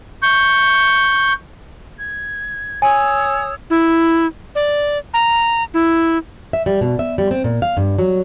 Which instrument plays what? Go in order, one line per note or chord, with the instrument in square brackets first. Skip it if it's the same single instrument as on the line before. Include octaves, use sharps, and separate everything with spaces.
[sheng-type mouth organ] C#6 G6
[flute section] G#6
[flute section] C#5 D#6 E6 [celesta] G#5
[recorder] E4
D5
A#5
E4
[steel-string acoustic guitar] E5
G3
B2
E5
G3
C4
A#2
F5
G2
F#3